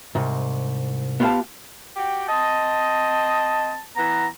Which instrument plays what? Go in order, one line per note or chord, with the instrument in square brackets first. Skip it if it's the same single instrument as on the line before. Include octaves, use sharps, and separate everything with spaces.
[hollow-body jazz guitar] C2 G#2
B3 F4 G4 D5 F5 A5
[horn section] F#4 G4 G5
[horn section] C4 D#5 [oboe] A5
[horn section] E3 B3 [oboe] A#5